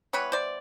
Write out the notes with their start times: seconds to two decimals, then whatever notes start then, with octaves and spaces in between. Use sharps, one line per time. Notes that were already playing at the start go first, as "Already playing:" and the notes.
0.13 E3 G3 B3 B4 C#5
0.32 C5 D5